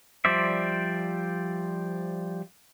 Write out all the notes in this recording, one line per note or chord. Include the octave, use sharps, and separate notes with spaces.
F3 G3 C5 D5 E5